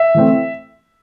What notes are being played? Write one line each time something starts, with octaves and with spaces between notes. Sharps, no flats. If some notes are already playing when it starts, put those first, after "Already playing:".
Already playing: E5
E3 A3 C4